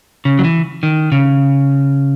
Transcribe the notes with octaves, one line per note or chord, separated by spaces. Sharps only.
C#3
F#3
E3
D#3
C#3